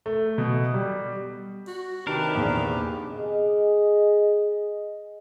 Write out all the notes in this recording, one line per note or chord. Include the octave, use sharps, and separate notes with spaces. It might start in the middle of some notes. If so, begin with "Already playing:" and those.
A3
B2
G3
F#4
C3 D#3 D4 G4 A#4 B4
A#1 E2
G#4 D#5